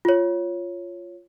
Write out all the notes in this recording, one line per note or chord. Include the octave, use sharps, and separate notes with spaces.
F4 C#5